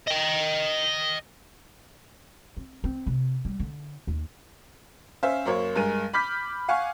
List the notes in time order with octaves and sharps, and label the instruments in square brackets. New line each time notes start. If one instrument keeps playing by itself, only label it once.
[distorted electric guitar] D#5 G5
[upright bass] C4
C4
C3
G3
D3
D#2
[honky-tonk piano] C#4 C5 E5 F5
F#2 A#3 C5 C#5
G2 G#3 A#4 D#7
B5 D6 F6 G6 B6
F5 F#5 G#5 C#6